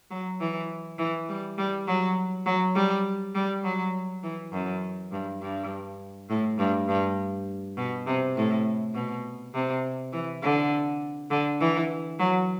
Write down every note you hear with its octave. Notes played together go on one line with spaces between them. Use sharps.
F#3
E3
E3
G3
G3
F#3
F#3
G3
G3
F#3
E3
F#2
G2
G2
A2
G2
G2
B2
C3
A2
B2
C3
E3
D3
D3
E3
F#3